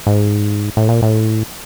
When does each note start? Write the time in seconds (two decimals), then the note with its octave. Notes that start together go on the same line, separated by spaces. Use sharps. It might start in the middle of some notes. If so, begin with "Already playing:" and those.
0.07 G#2
0.77 A2
0.89 A#2
1.02 A2